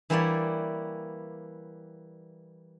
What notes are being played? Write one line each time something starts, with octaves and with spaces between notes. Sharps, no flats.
E3 G3 A#3 E4 C#5 D5